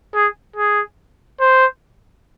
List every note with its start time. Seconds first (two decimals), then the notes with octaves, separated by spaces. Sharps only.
0.14 G#4
0.56 G#4
1.41 C5